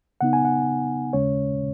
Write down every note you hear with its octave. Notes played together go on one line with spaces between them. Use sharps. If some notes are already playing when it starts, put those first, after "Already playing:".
C#3 B3 D#4 F#5
G#5
F#5
D#2 C#3 G#3 C#4 C#5